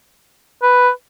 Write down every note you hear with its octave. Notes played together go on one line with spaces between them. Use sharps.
B4